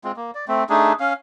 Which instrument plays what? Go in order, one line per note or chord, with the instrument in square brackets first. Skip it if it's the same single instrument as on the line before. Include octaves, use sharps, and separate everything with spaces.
[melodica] G#3 C4 F4
A#3
D5
A3 C4
A3 D4 D#4 G#4
C#4 F5